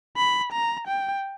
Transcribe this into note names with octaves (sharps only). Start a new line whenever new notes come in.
B5
A#5
G5